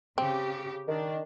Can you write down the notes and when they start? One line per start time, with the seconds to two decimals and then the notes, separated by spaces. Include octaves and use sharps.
0.18 C#3 C4 G4
0.88 D#3 D4